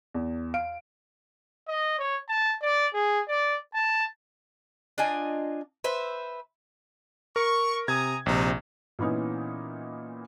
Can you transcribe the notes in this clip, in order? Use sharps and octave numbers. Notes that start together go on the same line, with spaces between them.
E2
F5 D7
D#5
C#5
A5
D5
G#4
D5
A5
D4 F4 D#5 G#5
B4 C5 E5
A#4 C#6
C3 G#5 A#5 D#6 G#6
A#1 C3 C4 D#4
A#2 E3 B3 C#4 D#4 E4